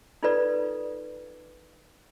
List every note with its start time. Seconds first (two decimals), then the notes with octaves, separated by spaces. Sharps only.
0.23 D#4 F4 A4 B4 D5